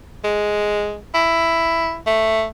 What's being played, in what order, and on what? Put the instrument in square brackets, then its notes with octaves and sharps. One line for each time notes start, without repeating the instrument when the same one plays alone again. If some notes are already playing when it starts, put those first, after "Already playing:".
[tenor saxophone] G#3
E4
A3